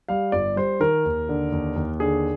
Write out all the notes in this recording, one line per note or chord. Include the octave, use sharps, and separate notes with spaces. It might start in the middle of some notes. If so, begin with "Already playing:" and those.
G3 F5
G1 D5
G3 C5
D#3 A#4
D#2
D3
D#2
D#2
D3 G#4